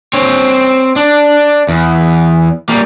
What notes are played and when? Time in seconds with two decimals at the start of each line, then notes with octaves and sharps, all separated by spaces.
0.13 C4 C#5
0.96 D4
1.69 E2
2.69 G3 A#3